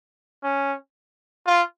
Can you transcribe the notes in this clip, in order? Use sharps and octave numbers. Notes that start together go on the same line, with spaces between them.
C#4
F4